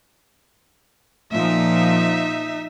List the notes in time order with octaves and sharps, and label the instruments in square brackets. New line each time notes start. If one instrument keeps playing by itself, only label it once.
[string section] A#2 F3 [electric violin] D#4 E5